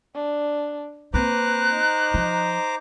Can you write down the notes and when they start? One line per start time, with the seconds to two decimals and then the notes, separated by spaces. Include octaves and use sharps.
0.15 D4
1.14 A#3 C4 B4 C5 A#5 D6 F#6
1.73 D#4
2.14 F3